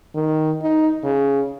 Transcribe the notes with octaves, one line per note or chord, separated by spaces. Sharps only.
D#3
D#4
C#3